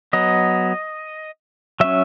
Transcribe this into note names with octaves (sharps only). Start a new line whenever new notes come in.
F#3 B3 D#5
F#3 C#4 E5